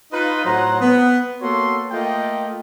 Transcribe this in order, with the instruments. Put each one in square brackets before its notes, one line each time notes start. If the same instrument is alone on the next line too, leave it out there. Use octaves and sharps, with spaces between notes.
[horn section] D#4 F4 B4
A2 F#3 C5 F#5 A#5
B3
A#3 B3 F#4 A4 C#5 C6
A3 A#3 F4 D#5 G5